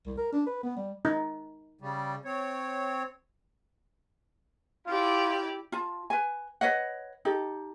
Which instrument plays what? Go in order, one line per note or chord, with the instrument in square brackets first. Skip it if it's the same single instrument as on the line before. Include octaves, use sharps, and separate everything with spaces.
[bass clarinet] C2
A#4
D4
B4
B3
G3
[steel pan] D#4
[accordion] C#3 G3
C4 C#5
[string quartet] E4 G4 D5 [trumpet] F4
[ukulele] F4 A5
B4 G#5
B4 C#5 D#5 F#5
D#4 G4 A4